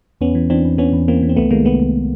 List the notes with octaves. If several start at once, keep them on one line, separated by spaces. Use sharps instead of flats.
E2 B3 C#4
E3
E3 C4 D4
E2
E3 B3 C#4
E2
E3 A#3 C4
E3
C4
C2 A3 B3
D#3 G#3 A#3
C2 A3 B3
C2